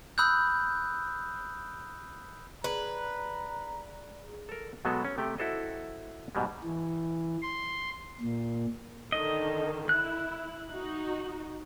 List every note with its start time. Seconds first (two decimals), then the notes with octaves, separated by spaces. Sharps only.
0.18 B5 D#6 E6 F#6 G6
2.64 G#4 B4 D5 A#5
4.49 A4 A#4
4.85 B2 F#3 G#3 B3 A4
5.05 C#4
5.18 C3 A3 G4 G5
5.38 E4 F#4 A4 C5 D#5
6.35 G#2 B2 G3 G#3
6.64 E3
7.43 C6
8.21 A#2
9.12 D3 D#3 D#5
9.89 E4 F#6
10.70 D#4 F#4